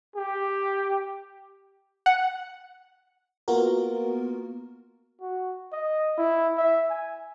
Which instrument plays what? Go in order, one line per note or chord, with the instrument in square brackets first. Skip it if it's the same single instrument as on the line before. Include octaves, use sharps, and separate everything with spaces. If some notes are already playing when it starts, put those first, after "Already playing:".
[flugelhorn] G4
[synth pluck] F#5
[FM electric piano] A#3 B3 F4 F#4 A#4
[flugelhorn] F#4
D#5
E4
E5
G#5